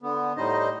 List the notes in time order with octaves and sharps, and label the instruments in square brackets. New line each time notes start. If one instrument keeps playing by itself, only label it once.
[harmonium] D3 B3
A2 G3 D#4 C5 D#5